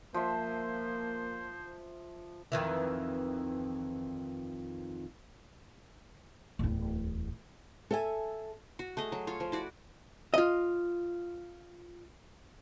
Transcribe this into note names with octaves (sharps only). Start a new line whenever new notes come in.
F3 A#3 C5 E5
F2 D#3 E3
D1 E2
A4 E5 G#5
F#4
A3 G#4 D#5
F#3
F4 C#5
F3
E4 F#4 D5
F4 D#5